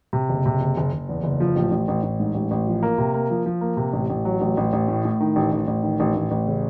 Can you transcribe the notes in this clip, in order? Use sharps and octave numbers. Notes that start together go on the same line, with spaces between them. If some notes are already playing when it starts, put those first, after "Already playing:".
C3
F#1
C3
F#1
F#1
F#1
E2
F#1
F3
A1
A1
A1
A1
G#2
A1
A1
F3
A#3
C3
A#3
F3
F3
A#3
C3
A1
A1
F#3
A1
A1
A1
A2
A2
D#3
A1
A1
A1
D#3
A1
A1
A1
C#3